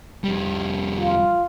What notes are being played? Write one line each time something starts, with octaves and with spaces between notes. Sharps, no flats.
F2 G3
F4